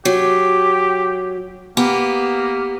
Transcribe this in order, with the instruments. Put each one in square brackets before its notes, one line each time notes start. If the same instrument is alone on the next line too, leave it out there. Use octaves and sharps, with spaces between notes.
[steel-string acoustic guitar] F#3 [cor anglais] G4
[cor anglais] A#3 [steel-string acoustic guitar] B3 G4